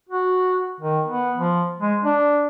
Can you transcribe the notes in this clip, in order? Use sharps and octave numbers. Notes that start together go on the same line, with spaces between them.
F#4
D#3
B3
F3
G#3
D4